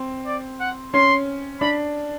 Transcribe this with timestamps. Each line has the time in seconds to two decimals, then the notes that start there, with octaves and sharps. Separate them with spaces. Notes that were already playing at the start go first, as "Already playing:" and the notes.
Already playing: C4
0.26 D5
0.60 F#5
0.94 C#4 C6
1.61 D4 B5